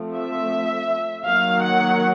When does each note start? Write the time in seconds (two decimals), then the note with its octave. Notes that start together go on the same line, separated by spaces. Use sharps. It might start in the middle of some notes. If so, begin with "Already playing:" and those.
Already playing: F3 A3 C4
0.16 E5
1.26 D#3 F#3 A#3 F5
1.63 F#5